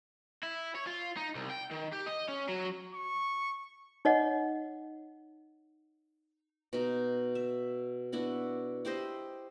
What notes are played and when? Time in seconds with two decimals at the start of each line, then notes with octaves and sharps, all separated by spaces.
0.43 E4
0.75 C#5
0.87 F4
1.17 D#4
1.35 C2
1.50 G5
1.71 D#3
1.92 G4
2.06 D#5
2.29 C#4
2.49 F#3
2.94 C#6
4.05 D#4 C#5 D#5 F#5
6.73 B2 D#4
7.35 E5
8.12 B3 D4 E4 F#4
8.85 E4 G4 C5 D#5